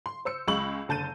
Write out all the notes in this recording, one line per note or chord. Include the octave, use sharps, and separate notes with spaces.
C6
C5 E6 C#7
C#2 G#3 B5 C#6 E6 F#7
F#1 D3 A5 G6 D#7